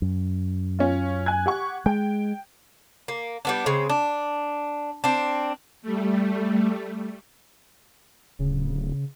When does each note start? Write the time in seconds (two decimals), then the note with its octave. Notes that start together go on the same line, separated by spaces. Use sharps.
0.02 F#2
0.79 C#4 F4
1.26 G#5 F#6 G#6
1.46 G4 F#5 C#6
1.86 G#3 G5
3.08 A#3
3.45 G3 B3 D4
3.66 C#3 G#3 C4
3.89 D4
5.04 C4 D4
5.82 G3 A3
8.39 D1 C#3